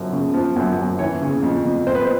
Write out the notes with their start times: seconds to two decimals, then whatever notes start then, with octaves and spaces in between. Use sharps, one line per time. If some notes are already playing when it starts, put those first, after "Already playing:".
Already playing: F#2 F3
0.12 C#3
0.34 F3
0.56 F#2
0.78 F#2
0.99 E3 C#5
1.22 C#3
1.43 F2
1.65 F2
1.87 F2 C5
1.95 B4
2.03 C5